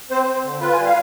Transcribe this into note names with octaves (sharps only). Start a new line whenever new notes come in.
C4 C5
C4 C5
D3
F4 B4
G3 G#5
F5